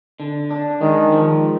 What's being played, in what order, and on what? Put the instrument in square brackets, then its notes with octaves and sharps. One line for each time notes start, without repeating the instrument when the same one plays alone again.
[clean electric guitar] D3
D4
[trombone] D#3 [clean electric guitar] G#3
[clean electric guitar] F3